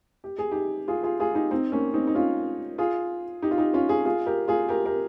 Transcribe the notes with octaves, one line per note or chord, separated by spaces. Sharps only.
G4
G#4
D#4 G4
F4 G#4
F4 G#4
F4 G#4
D#4 G4
C4 D#4
A#3 C#4
C4 D#4
D#4
C#4 F4
F4 G#4
D#4 G4
F4
D#4 G4
C#4 F4
F4 G#4
F4 G#4
G4 A#4
F4 G#4
G4 A#4
G4 A#4